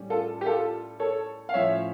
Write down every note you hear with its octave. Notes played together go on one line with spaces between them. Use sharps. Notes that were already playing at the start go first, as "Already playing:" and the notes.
Already playing: A2 G3 C#4
F4 A4
G4
F4 A4
A4 C#5
F5
A2 F3 C#4 C#5 E5